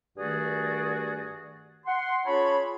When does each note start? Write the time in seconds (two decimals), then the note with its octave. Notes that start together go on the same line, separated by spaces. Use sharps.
0.18 G2 D#3 A3 F#4 G#4 D5
1.87 F#5 C6
2.26 C#4 F4 G#4 C#5 A5 B5